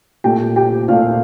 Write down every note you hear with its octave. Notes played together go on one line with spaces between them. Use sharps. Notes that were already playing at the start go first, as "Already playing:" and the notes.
A#2 A3 G4 G5
G4 G5
A#2 A3 F4 F5